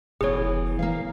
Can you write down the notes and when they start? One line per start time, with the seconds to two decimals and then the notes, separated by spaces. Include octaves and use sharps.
0.21 F1 B2 E3 G#4 C#5
0.79 E3 A#3 F5